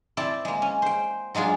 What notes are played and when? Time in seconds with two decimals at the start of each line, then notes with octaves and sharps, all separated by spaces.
0.17 C4 E4 D5 A5
0.45 G#3 A#3
0.62 C#4
0.82 C5 G5
1.35 F#3 G#3 D4 F4 G#4